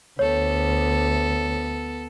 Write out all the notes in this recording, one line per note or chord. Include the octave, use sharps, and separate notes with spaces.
D2 B3 A4 C#5